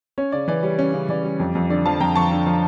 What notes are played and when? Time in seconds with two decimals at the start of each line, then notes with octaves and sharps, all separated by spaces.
0.18 C#4 C#5
0.32 C#3 D5
0.48 E3 D5
0.63 G3 C#5
0.79 C#4
0.94 C#3
1.09 E3 D5
1.24 G3
1.40 F2
1.55 F2
1.70 D3 D5
1.86 F3 F5 A5
2.00 F2 G5 A#5
2.16 F2 A5 C#6
2.32 D3
2.46 F3